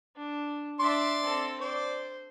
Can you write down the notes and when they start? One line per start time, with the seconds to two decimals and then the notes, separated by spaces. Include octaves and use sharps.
0.16 D4
0.80 D4 D5 E5 C6
1.23 C4 A4
1.61 C5 D5